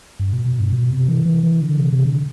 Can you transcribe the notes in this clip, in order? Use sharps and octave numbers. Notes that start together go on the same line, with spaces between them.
G2
B2
B2
G2
B2
C3
E3
E3
E3
D3
C3
C3
D3